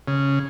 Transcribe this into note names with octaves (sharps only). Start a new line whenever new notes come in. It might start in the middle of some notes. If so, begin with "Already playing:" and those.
C#3